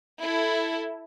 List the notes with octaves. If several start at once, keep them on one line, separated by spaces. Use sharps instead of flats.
E4 A4